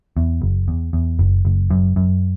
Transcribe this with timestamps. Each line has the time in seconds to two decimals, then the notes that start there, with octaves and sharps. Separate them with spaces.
0.17 E2
0.42 F#1
0.68 E2
0.93 E2
1.19 F#1
1.45 F#1
1.70 F#2
1.96 F#2